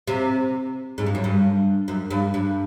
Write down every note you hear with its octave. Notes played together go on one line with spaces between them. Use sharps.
C3
G#2
G2
F#2
G2
F#2
G2
G2